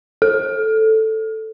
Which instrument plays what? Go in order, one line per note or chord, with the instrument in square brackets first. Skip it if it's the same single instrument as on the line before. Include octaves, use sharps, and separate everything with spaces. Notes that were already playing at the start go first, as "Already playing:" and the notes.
[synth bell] A4